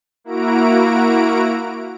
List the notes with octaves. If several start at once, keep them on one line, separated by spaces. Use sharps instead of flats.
A#3 E4 F#4 A#5 D7